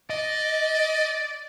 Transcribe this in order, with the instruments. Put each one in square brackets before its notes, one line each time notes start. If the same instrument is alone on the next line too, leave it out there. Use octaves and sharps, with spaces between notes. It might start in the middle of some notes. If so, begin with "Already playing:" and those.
[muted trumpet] D5 [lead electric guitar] D#5